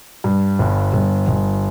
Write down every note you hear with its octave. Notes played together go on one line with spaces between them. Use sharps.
G2
G1
G1
G1